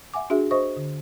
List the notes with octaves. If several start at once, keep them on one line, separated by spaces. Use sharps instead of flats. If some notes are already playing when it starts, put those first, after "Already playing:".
E5 F#5 G#5 D6
D4 F#4 G#4 E5
C5 D#5 E5 C#6 D#6
D3